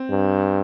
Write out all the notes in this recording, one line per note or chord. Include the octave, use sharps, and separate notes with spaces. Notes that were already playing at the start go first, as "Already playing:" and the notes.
Already playing: C4
G2